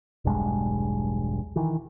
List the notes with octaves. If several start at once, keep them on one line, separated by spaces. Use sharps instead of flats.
E1 B1 G2 G#3
D#3 E3